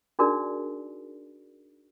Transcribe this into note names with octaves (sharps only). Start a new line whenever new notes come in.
D4 D#4 F#4 G#4 A#4 D5